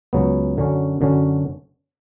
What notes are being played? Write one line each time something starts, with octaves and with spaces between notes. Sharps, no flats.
C#2 C#3 F#3 B3
F#2 D3 F#3 C#4
F#2 D3 F#3 C#4